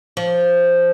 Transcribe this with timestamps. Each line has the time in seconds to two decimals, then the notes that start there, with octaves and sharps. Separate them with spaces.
0.17 F3